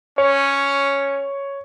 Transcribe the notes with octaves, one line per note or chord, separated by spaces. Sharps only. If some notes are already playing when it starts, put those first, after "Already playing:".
C#4 C#5